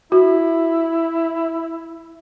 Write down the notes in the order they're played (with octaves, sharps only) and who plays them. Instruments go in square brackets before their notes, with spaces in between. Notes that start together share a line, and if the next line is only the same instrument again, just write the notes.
[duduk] E4 [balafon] F#4